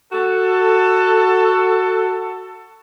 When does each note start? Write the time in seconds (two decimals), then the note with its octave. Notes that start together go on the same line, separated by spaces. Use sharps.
0.13 F#4 A4